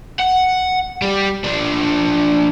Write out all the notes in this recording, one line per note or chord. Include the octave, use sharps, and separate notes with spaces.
F#5
G3 G4
F3 D4